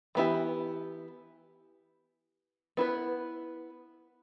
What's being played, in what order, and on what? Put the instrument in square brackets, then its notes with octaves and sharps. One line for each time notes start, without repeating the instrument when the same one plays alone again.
[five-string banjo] E3 B3 E4 G4
B3 E4 B4